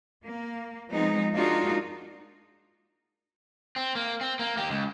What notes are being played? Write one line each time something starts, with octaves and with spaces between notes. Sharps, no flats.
A#3
F3 G#3 B3 C4 D#4
G#3 A#3 D4 D#4 F4 F#4
C4
A#3
C4
A#3
A#3 G4
C#2